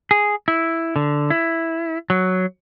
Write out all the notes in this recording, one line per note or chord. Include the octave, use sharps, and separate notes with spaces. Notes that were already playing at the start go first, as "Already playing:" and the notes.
G#4
E4
D3
E4
F#3